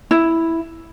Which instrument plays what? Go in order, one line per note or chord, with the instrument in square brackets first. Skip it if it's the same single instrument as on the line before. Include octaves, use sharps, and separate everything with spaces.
[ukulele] E4